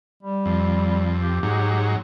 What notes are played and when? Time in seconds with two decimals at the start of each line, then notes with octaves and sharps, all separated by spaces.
0.23 G3
0.46 F2
1.19 G4
1.43 G#2 F#3